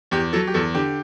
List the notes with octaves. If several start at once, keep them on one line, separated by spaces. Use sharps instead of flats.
E2 G4
F#3 A4
G4
E2 A4
D3 G4